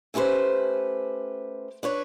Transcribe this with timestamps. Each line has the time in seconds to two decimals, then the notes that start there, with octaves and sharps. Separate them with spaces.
0.14 A3 C#4 G4 B4 C5
1.83 D4 B4 C#5